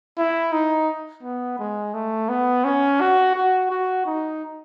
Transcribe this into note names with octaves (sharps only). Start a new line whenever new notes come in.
E4
D#4
B3
G#3
A3
B3
C#4
F#4
F#4
F#4
D#4